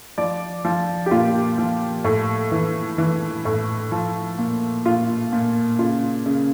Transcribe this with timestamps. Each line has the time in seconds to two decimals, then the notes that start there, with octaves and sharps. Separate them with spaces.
0.18 F3 D5
0.65 F3
1.06 G4
1.11 A#2 F4
1.58 F3
2.05 A2
2.52 E3
2.98 E3
3.45 A2
3.92 F3
4.38 A#2
4.86 A#2 F4
5.33 A#2
5.79 C#3 F4
6.26 C#3